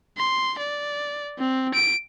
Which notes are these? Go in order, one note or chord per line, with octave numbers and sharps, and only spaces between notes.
C6
D5
C4
D7